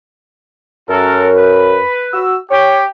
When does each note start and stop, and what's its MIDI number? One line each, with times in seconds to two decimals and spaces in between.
0.89 1.78 42
0.89 1.29 66
0.89 1.29 69
0.89 1.29 70
1.35 2.20 71
2.13 2.36 66
2.13 2.36 88
2.50 2.85 67
2.50 2.80 73
2.50 2.85 79